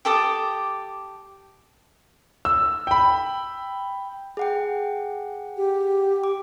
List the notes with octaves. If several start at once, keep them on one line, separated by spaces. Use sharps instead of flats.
G4 A4 D6 D#6
E6
G5 B5
G#4 F#5 G5
G4
D6